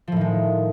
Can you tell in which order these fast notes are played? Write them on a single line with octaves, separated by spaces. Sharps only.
F3 A2 D#3 G#3